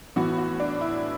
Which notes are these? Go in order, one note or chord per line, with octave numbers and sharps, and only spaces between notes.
A2 E3 B3 F#4
F#4
D4
E4